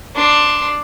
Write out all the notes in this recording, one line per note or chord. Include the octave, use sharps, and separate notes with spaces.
D4 C6